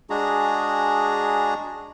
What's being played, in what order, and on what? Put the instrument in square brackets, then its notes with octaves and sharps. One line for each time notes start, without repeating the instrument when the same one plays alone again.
[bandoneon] G#3 D4 F#4 G#4 A#5